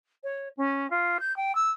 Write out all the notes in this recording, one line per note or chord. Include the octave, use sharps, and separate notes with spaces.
C#5
C#4
F4
G6
G5
E6